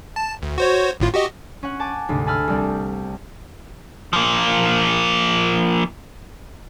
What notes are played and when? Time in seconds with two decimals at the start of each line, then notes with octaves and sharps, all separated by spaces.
0.16 A5
0.42 D2
0.58 F#4 C5 C#5
1.00 G#1 A2 F4
1.14 F#4 G4 D#5
1.63 C#4 F#5
1.79 G#5 A5 D6
2.09 D2 G#2 C3
2.26 G#5 A5 B5 E6 F6
2.48 C2 G3 C4
4.13 F3 A#3